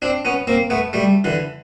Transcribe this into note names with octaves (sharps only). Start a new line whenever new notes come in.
C4 D4
B3 C#4
A#3 C4
A3 B3
G3 A3
D3 E3